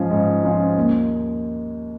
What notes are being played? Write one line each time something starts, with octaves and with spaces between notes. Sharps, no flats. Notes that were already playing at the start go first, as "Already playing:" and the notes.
Already playing: G#2 F3 C#4 F4
G#2
F3 C#4 F4
D#2